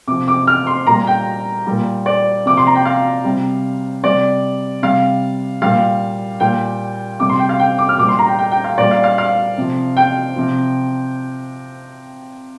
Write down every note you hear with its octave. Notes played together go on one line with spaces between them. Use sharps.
C3 F3 D6
D6
F6
C6
A#2 G3 A#5
G5
A#2 G3
D5
C3 F3 D6
C6
A#5
G5
F5
C3 G3
C3 G3 D5
C3 G3 F5
A#2 G3 F5
A#2 G3 G5
C3 G3 D6
C6
G5
F5
G5
D6
F6
A#2 G3 D6
C6
A#5
G5
G5
G5
F5
A#2 G3 D5
F5
F5
F5
C3 F3
G5
C3 F3